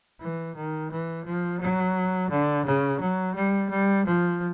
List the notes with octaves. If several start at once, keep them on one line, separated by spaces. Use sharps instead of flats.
E3
D#3
E3
F3
F#3
D3
C#3
F#3
G3
G3
F3